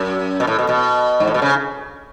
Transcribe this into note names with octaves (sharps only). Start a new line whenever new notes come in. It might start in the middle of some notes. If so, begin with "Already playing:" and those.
Already playing: F#2
B2
A2
B2
B2
G#2
A2
B2
C#3